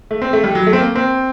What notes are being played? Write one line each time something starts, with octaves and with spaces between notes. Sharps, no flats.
A3
C4
A3
G3
F#3
A3
C4
A#3
C4